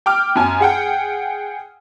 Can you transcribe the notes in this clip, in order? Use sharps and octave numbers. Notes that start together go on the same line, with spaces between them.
G5 D6 F6
F#2 G#5
G#4 F#5 G5